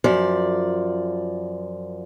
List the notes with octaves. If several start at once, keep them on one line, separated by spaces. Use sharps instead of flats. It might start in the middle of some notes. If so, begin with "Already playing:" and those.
F#2 F3 D5